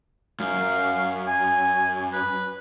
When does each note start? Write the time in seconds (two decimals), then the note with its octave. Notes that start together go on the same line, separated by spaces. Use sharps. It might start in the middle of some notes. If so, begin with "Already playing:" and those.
0.40 F#2 F5
1.27 G#5
2.13 B4